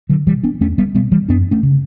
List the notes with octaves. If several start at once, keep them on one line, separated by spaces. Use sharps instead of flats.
D3 F#3
B2 E3 G3
B3 D4
E2 A3 C#4
G3 B3
B2 G3 B3
E3 G3
F#2 B3 D4
A3 C#4
C#3